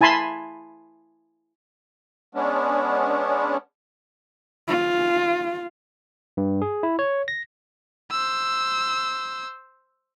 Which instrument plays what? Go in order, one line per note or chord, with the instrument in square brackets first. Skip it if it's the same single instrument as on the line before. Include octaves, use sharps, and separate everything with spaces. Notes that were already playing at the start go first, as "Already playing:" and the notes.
[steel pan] E4 G#5 A5 B5 C6
[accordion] G#3 B3 C#4 D4
[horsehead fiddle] F4
[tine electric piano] G2
G#4
E4
C#5
A#6
[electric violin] C5 E6